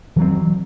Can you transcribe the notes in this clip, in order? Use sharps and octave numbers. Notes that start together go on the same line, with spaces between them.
E3 F#3 C4